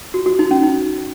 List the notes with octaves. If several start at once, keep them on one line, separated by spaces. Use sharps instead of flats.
F#4
F#4
D#4
C#4
D#4